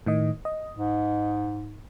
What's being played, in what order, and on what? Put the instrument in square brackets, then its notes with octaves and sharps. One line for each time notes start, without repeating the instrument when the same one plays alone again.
[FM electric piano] A2 D#3 D#5
D#5
[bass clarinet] G#2